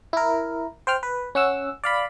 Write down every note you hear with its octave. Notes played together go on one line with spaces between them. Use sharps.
E4 A#4
C5 G5 F6
B4
C#4 F#5 E6
D5 F5 B5